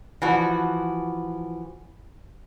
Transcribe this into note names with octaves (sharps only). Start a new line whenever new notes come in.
E3 F3 F#4